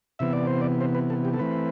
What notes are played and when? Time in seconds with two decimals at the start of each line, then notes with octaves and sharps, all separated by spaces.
0.19 C3 E3 B3 E5
0.33 D5
0.47 C5
0.61 D5
0.80 C5
0.95 B4
1.10 A4
1.25 G4
1.34 A4
1.39 E3 A3 C4 B4